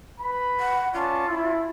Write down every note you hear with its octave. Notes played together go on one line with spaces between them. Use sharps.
B4 B5
F#5
C#4 F4 D5 A5
E4